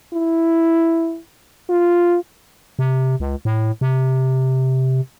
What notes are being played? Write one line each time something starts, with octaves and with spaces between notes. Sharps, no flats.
E4
F4
C3
C#2
A2
C3